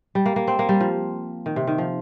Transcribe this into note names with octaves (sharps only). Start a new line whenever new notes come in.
G3
A#3
A#3
C4
A#3
G3
F3
D#3
C3
D#3
F3